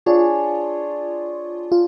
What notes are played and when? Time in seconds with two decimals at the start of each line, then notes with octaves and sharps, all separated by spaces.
0.06 D4 F4 G#4 C#5
1.72 F4